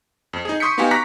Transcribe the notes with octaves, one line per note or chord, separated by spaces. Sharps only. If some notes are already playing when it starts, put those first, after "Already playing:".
F2
D#4 G#4
C6 C#6 D#6 G6 B6 C#7
B3 D#4 F#4 G4 F5 G#5
A#5 C#6 D6 F#6 A#6 B6